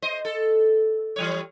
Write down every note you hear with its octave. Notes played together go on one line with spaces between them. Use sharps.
C5 D#5
A4
E3 G3 C#5